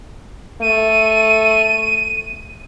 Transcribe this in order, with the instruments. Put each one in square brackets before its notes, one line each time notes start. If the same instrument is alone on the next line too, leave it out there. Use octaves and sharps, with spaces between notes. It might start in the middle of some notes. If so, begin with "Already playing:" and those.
[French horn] A3 [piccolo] D#7